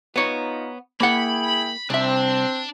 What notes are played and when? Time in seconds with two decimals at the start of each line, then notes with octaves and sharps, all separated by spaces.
0.16 B3 D#4 F4 C#5 A#5
1.00 A#3 E4 G#4 F#5 G5 B5
1.90 C2 C4 D4 E5